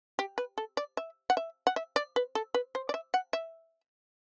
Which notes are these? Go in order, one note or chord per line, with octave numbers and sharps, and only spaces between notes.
G4
B4
A4
D5
E5
F#5
E5
F#5
E5
D5
B4
A4
B4
C5
D5
E5
F#5
E5